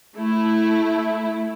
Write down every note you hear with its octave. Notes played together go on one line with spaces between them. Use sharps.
A3 E4